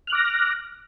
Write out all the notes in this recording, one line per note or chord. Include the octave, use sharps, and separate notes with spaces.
D6 F6 F#6 A#6